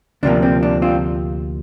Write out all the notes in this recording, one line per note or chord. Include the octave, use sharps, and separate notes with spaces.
D2 C3 F3 A#3 D4
C4
D4
C4 F4